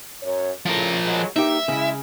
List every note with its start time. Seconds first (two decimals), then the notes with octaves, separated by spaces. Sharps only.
0.23 F#2 C#5
0.66 A2 C#3 F3 A#4
1.05 F#3 G#3
1.36 G2 A#3 D#4 G4 E5
1.68 C#3 G#3 E4